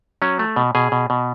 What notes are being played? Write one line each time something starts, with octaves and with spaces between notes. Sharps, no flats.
F#3 C#4
A3
B2
B2 G#4
B2
B2